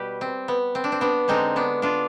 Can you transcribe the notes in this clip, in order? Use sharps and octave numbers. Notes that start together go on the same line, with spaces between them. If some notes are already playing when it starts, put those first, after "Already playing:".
Already playing: B2 G3 G4 B4
C4
B3
C4
D4
C4
B3 D4
D3 G#3 C4 D#4
B3 D4
D4 F4